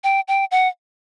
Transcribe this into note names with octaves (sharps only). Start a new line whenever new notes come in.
G5
G5
F#5